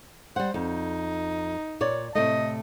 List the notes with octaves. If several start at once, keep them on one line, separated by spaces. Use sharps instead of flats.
G3 C5 F#5
F2 D#4
A#2 C#5 D5
A2 C3 A3 D#5